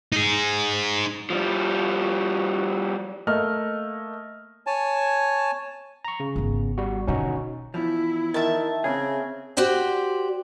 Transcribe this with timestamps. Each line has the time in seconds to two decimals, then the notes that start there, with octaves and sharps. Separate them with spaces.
0.13 D#4 G#4
1.30 F3 G3
3.27 A3 A#3 D#5 F6
4.66 C#5 G#5 A5
6.05 A#5 C#6
6.20 C#3
6.36 G#1 B3
6.78 G3 F#4
7.07 B2 D3 C#4 D#4 F#4
7.74 E2 F3 E4
8.34 D#3 E5 A5
8.84 C#3 C4 G#4
9.57 F#4 G4 C5 D5 G5